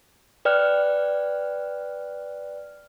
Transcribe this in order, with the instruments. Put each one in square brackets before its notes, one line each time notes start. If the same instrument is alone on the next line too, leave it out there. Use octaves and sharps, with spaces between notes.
[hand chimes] B4 D5 G5 F6 F#6